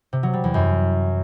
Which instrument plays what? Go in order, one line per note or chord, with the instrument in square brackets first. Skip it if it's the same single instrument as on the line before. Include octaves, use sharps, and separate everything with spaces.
[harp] C3
F#3
G3
E2
F#2